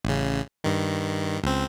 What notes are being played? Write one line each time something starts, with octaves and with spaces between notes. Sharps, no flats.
A1 C#3
G2 D#3
C#2 C4